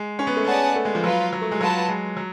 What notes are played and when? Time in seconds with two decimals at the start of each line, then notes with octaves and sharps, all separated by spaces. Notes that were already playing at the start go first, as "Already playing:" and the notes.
Already playing: G#3
0.19 C#4
0.27 B3
0.36 A3
0.44 B3 C#4 G#4 D5 F#5 A5
0.75 A3
0.85 G#3
0.95 F3
1.04 F#3 F4 B4 F5
1.33 F#3
1.41 A3
1.51 G#3
1.61 F#3 F4 B4 F#5 A5
1.88 G#3
2.17 F#3